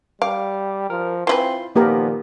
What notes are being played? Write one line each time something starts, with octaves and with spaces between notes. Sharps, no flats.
G3 F5 D6
F3 A#4
E3 C4 E4 F4 B4 C6
A#2 D#3 F3 A#3 B3 G4 A#4